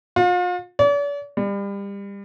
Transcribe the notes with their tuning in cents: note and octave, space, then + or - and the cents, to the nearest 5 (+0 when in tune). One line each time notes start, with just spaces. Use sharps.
F4 +40
D5 -45
G3 +30